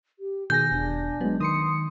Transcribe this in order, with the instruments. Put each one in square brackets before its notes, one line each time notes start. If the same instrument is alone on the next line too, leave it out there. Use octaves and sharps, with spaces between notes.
[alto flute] G4
[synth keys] B2 G#5 A#6 [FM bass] D#3 [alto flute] G#4 [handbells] G6
[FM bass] E1 [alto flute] D4
[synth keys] F#3 G#3 [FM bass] B3
[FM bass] D#3 [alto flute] C6 [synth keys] D#6 C7 C#7